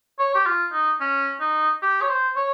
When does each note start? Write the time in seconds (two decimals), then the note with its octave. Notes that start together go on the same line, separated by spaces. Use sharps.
0.19 C#5
0.35 G4
0.46 F4
0.72 D#4
1.01 C#4
1.40 D#4
1.82 G4
2.02 C#5
2.09 C5
2.36 C#5